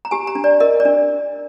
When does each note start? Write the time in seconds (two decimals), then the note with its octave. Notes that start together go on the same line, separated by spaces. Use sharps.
0.05 A#5
0.11 G4 G#5
0.27 A#5
0.35 D4
0.44 D5
0.60 A#4 D#5
0.80 D5
0.85 D4